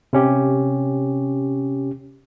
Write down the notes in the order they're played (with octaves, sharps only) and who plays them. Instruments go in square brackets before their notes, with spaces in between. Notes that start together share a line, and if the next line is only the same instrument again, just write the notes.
[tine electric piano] C3 C#4 G4